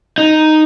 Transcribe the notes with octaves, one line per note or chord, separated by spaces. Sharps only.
D#4